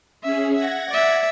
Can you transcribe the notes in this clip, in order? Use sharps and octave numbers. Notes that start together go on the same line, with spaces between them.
C#4 G#4 E5
E5 F#5 G#6 A#6
D5 E5